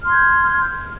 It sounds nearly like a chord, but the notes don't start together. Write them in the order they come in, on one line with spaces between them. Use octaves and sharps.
F6 C6 G#6 G6